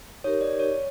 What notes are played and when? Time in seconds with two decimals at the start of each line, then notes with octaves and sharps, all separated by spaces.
0.24 D#4 G4 A#4 C#5
0.41 D5
0.59 C#5